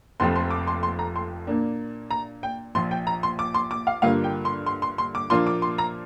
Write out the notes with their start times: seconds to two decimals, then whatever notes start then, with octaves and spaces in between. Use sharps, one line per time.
0.20 F1 F2 F3 C4 C6
0.36 C6
0.50 D6
0.67 C6
0.83 C6
0.99 A#5
1.16 C6
1.47 A#2 A#3 D4
2.11 A#5
2.43 G5
2.75 A#1 A#2 F3 C6
2.91 G5
3.07 A#5
3.23 C6
3.39 D6
3.54 C6
3.71 D6
3.87 F5
4.02 G2 D3 A#3 F4 F5
4.24 G5
4.45 C6
4.66 C6
4.82 C6
4.98 C6
5.15 D6
5.30 A#2 F3 A#3 D4 F4 C6
5.47 D6
5.62 C6
5.78 A#5